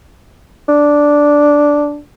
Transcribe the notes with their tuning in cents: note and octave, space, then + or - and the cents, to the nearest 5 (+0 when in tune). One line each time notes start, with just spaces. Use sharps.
D4 -5